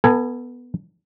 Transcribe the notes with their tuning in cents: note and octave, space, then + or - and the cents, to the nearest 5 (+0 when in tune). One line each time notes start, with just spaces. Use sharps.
B3 +0 A4 +30 G#5 +0